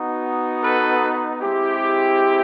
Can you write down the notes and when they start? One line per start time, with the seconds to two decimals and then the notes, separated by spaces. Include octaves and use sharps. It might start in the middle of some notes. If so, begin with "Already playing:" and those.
Already playing: B3 D#4 F#4
0.62 A4 B4
1.40 G#3 C4 E4 G4